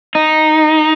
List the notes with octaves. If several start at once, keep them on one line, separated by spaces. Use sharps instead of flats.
D#4